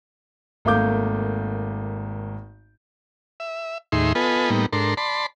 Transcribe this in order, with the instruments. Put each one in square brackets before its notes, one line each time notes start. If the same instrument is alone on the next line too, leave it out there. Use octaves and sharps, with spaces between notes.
[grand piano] G#1 A3 A#3 F5 D6 G6
[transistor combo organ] E5
D#2 A2 D#4 G#4 E5 C6
B3 F4 A4 B4 D#5 G#5
A2 G3 A#3 B3 D#4
G#2 D4 A4 A#4 C6
D5 A5 B5 C6